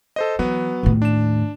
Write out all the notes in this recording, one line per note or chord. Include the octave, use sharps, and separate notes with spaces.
A4 C5 D#5
E3 F#3 B3
D#2 A2
D4 E7